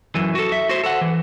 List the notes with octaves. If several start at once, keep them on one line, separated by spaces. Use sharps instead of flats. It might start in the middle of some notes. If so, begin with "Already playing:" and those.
F#2 E3
F#4 A4
E5
F#4 C5
A4 F#5
E3